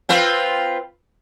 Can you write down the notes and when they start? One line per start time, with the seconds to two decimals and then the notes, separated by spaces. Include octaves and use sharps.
0.09 C4 F4 B4